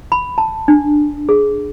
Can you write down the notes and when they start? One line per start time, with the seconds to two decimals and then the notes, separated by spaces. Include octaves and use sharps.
0.12 B5
0.38 A5
0.68 D4
1.29 G#4